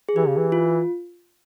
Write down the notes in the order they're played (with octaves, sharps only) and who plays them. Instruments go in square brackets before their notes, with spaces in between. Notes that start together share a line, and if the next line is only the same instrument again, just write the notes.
[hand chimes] G#4
[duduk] E3 [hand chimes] G4
[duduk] C#3
E3
[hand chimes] F4